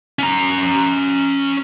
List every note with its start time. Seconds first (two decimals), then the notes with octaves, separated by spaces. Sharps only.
0.19 C#4 A#5